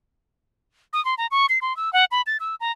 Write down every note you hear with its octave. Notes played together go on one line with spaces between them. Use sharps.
D#6
C6
A#5
C#6
C7
C6
E6
F#5
B5
A6
E6
A#5